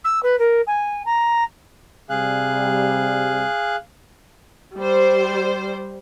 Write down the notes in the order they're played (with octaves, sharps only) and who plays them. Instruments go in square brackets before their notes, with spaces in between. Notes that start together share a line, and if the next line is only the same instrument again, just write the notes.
[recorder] E6
B4
A#4
G#5
A#5
[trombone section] C3 G3 [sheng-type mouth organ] G#4 F5 F#6
[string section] G3 C5